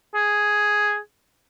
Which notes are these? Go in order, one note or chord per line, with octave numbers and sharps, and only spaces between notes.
G#4